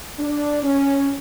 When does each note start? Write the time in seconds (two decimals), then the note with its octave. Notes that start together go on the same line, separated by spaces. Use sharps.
0.19 D4
0.63 C#4